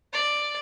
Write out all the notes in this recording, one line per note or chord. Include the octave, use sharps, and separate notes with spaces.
D5